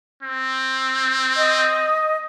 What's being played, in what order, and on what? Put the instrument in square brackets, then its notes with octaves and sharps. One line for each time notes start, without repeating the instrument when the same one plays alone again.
[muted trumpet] C4
[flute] D#5